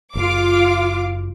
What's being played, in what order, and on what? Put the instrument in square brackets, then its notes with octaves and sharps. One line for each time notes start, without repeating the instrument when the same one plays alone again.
[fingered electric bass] F#1 [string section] F4 F5 D6